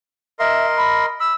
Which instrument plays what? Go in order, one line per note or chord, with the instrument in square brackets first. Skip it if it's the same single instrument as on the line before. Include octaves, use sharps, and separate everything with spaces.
[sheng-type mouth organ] A#4 D#5 C6 [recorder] E5
[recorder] B5
[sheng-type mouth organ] B5 [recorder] E6